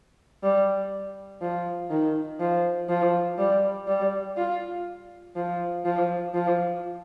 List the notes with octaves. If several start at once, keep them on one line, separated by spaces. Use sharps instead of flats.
G3
F3
D#3
F3
F3
G3
G3
F4
F3
F3
F3